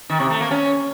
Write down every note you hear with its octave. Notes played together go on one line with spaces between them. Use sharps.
D#3
C3
A3
A#3
C#4